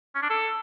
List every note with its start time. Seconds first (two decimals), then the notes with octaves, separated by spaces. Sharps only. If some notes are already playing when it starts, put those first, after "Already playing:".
0.15 C#4
0.22 D4
0.30 A4